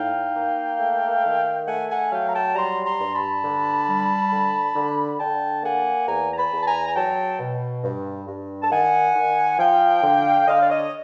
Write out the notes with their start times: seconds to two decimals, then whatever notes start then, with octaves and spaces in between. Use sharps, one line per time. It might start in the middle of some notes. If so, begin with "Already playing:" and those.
Already playing: A2 D#4 F5 G5
0.37 A#3
0.80 A3
1.24 D#3
1.68 A3 F#5 G#5
1.90 F#5 G#5
2.11 F#3 F5 G5
2.27 A#5
2.33 G5 A5
2.55 G3 A#5 C6
2.85 A#5 C6
3.00 G2
3.14 A5 B5
3.44 D3
3.88 G3
4.31 D3
4.76 D3
5.19 D3 G5 A5
5.64 A#3 F#5 G#5
6.07 E2 G#5 A#5
6.33 A#5
6.37 A5 B5
6.52 E2
6.62 A5
6.66 G#5 A#5
6.87 G#5
6.95 F#3 G5 A5
7.39 B2
7.84 G2
8.28 G2
8.62 A5
8.71 D#3 F#5 G#5
9.16 D#3
9.59 F3 F5 G5
10.03 D3
10.47 D3 D#5 F5
10.62 D5
10.70 C#5 D#5